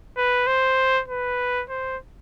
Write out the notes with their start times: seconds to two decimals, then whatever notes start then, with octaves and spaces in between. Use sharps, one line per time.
0.17 B4
0.47 C5
1.08 B4
1.70 C5